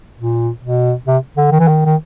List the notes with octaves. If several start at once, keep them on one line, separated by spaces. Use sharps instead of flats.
A#2
B2
C3
D3
D#3
E3
D#3
D#3